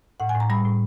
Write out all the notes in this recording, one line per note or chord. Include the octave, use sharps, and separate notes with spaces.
A2 F#5
G#5
A2
A#5
G3 B5
A2